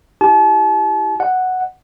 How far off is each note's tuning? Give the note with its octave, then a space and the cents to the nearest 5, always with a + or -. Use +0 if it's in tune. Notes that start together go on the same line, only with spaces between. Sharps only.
E4 +0 G4 +0 A5 -40
D#5 -35 F#5 +0